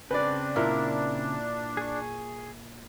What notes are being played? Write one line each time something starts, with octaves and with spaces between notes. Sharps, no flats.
C#3 C4 D4 B4 D5
A#2 E4 A#4
G#4 C#6